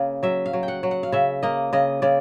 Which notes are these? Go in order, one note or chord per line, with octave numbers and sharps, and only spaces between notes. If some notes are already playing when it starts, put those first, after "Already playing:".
Already playing: C#3 A#3
F#3 E5
F5
F#3
G5
F#5
F#3
F#5
F5
C#3 E5
A#3 D#5
C#3 D#5
C#3 D5